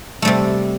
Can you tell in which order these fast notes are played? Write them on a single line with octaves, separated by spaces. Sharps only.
A3 G3 C3